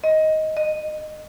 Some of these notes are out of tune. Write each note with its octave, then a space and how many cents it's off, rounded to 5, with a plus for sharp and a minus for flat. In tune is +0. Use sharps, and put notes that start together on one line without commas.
D#5 +10
D#5 -25